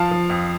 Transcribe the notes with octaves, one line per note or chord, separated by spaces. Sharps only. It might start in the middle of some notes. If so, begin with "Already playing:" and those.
Already playing: F3 F5 A5
F3
F2